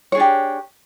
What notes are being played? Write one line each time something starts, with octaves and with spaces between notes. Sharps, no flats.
D4 G4 G#4 C#5